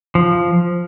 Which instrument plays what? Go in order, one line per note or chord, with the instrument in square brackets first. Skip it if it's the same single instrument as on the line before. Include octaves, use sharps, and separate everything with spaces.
[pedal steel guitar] F3